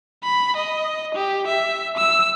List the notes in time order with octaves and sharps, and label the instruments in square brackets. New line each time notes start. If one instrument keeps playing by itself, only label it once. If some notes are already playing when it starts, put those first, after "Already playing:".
[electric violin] B5
D#5
G4
E5
E6